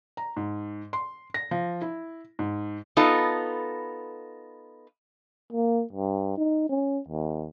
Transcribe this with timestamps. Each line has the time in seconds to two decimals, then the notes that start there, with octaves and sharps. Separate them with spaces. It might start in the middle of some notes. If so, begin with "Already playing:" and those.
0.17 A#5
0.37 G#2
0.93 C6
1.34 A#6
1.51 F3
1.82 E4
2.39 G#2
2.97 B3 D#4 F4 A4
5.53 A#3
5.93 G2
6.38 D#4
6.69 C#4
7.08 D#2